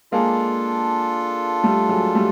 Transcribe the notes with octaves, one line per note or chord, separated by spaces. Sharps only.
G#3 A#3 D4 F4 A4
G3 A3
F#3 G#3
G3 A3